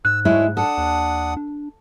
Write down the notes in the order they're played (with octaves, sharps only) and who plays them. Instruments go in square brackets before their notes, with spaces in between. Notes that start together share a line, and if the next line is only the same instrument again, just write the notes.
[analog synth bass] G#2 [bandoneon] E6 [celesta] F#6
[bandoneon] D2 A3 C#5 [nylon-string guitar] G#3 E4
[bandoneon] D4 F#5 D#6 [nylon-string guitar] A4
[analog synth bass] D#2
D4